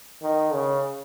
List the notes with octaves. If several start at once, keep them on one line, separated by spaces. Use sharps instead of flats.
D#3
C#3